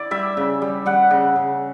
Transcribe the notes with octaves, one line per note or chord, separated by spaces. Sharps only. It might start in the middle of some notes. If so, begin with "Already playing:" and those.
Already playing: E4 D5
G3 E5
C#3
G3
G3 F#5
C#3
C#3